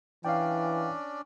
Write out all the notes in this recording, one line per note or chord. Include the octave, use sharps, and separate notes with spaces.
E3 C#4 D4 D5 F5 G5